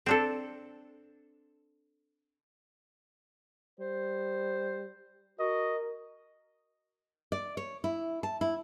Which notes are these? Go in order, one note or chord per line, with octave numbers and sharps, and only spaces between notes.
C4 D4 A4
G3 C5
F#4 A#4 D#5
D5
C#5
E4
A5
E4